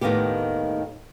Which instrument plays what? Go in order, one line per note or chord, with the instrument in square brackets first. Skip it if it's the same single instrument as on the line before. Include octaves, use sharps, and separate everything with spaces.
[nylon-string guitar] D#2 A2 D#3 A#3 B3 G4